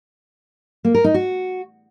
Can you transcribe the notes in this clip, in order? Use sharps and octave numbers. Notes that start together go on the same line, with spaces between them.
A#3
A#4
D#4
F#4